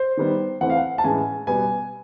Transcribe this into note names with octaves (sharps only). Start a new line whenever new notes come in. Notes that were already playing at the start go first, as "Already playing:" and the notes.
Already playing: C5
D#3 G3 B3
E3 A3 C4 F#5
F5
F#5
A5
A2 E3 G#3 C#4 G#5
B2 G3 B3 G#5